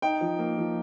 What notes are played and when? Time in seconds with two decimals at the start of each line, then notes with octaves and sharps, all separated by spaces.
0.02 D#4 G5
0.21 F3
0.39 A#3
0.58 F3